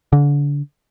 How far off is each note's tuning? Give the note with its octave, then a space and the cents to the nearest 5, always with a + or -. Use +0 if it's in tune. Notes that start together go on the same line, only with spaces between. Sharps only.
D3 -30